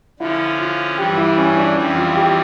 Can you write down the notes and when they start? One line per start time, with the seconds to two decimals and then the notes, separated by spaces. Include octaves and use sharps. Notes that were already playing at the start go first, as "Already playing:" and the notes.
0.19 D3 F3 C#4 E4
0.59 F4
0.98 G2 E3 G3 G4
1.17 E4
1.37 C#4
1.57 D4
1.76 F2 E3 G3 E4
1.96 F4
2.15 G4